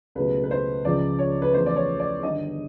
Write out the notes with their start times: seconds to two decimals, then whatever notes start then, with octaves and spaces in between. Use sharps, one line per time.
0.15 C#2 B2 F#3 A3 B4
0.44 B4
0.51 C5
0.85 C#2 C#3 F3 D5
1.19 C#5
1.42 B4
1.53 E2 C#3 F3 A3 C5
1.66 D5
1.76 C#5
2.00 D5
2.22 G1 G2 D#3 D#5